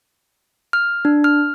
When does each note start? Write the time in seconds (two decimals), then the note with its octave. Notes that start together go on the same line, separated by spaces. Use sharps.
0.73 F6
1.05 D4
1.24 F6